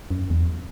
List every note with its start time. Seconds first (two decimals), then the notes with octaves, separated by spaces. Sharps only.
0.11 F#2
0.30 E2
0.40 F2